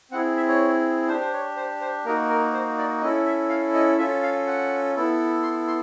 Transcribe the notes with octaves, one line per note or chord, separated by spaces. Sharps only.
C4 E4 G#4 F#5
E5
C#5
D4 G4 C5
C5
C#5
C5
C5
A#3 D#4 F#4 A#4
A#4
C5
D5
C#4 E4 A4 D#5
E5
F5
D#5
C#4 F4 A4 E5
F5
F#5
B3 E4 A4
C6
C6